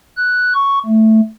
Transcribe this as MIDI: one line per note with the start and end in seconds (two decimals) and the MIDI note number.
0.17 0.54 90
0.54 0.79 85
0.86 1.20 57